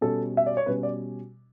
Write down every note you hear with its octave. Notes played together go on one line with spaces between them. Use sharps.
B2 G3 C#4 A4
E5
D5
C#5
B2 G3 C#4 B4
D5